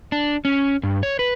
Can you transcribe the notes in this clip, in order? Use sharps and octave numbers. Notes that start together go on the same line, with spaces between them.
D4
C#4
G2
C#5
B4